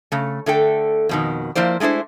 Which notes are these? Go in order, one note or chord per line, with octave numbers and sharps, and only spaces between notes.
C#3 A3
D3 A3 A4 G5
F2 B2 D#3
F3 A#3 E4 C5 D5
G#3 A3 D4 E4 C5